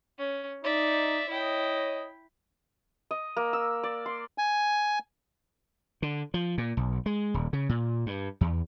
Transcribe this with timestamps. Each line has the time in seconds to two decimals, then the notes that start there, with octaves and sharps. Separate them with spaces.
0.19 C#4
0.64 D#4 D5 E5
1.29 E4 C#5 D#5 G5
3.11 D#5
3.37 A#3
3.53 E6
3.83 D5
4.06 C6
4.38 G#5
6.02 D3
6.34 F3
6.58 A#2
6.77 B1
7.06 G#3
7.34 D#1
7.53 C#3
7.69 A#2
8.06 G2
8.41 E2